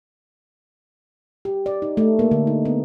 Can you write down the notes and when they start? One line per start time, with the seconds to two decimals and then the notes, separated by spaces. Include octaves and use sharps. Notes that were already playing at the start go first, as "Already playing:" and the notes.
1.45 G4
1.66 D5
1.82 D#4
1.97 A3
2.19 A#3
2.31 D3
2.47 D#4
2.65 B3